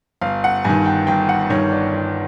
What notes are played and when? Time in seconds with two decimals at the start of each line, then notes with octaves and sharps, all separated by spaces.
0.21 G1 F5
0.44 F#5
0.64 G2 D#3 G#5
0.86 G5
1.07 G1 G5
1.29 F#5
1.50 G2 D#3 C#5
1.71 D5
1.93 G1